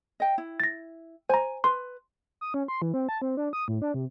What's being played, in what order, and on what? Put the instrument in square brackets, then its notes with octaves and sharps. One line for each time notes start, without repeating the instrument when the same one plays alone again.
[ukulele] D#5 G5
E4
[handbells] A6 A#6
[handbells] C5 A#5 [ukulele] G#5
[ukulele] B4 [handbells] C6
[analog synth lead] D#6
C#4
C6
E3
C4
A5
C4
D4
D#6
A2
D4
C3